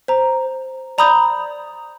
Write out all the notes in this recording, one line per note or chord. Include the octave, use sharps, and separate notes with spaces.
C5 A#5
D5 A#5 B5 D#6 G6 F7